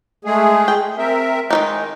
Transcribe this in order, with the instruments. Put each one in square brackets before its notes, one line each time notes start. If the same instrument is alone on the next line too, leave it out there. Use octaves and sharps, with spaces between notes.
[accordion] G#3 A3 G#4
[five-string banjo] G5
[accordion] C4 A#4 E5
[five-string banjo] D#3 F3 D#4 [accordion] G#3